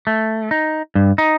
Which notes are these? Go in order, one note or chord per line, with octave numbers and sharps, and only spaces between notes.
A3
D#4
G2
D#4